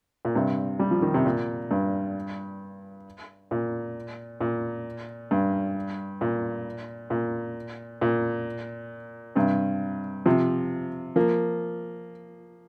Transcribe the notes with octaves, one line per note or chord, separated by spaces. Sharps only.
A#2
G2 C3
G3
F3
D#3
C3
A#2
G2
A#2
A#2
G2
A#2
A#2
A#2
G2 C3
C3 F3
F3 A#3